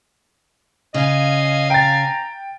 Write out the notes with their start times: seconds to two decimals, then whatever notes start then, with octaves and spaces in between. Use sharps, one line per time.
0.94 C#3 D#5 F5 G#5
1.70 G5 A#5 A6